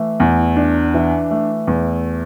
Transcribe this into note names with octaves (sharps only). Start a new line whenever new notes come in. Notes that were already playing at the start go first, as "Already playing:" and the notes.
Already playing: E3 A3
E2
D4
E3
A3
E2